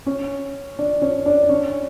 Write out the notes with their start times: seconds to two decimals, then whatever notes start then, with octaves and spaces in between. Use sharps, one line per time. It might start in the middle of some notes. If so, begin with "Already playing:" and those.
0.06 C#4 C#5
0.79 D4 D5
1.02 C#4 C#5
1.26 D4 D5
1.49 C#4 C#5